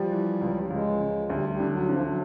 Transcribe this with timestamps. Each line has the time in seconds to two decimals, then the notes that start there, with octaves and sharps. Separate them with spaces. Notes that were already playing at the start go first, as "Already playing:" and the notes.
Already playing: F3 G3
0.11 E3
0.41 C#2
0.70 C#2 G#3
1.00 C#2
1.29 D2 G3
1.49 G3
1.60 D3
1.69 F#3
1.89 D3 F3
2.04 F#3